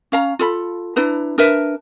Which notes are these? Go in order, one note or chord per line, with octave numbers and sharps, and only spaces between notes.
C#4 F5 A#5
F4 A4 B5
D4 E4 B4 A#5
D4 A#4 B4 E5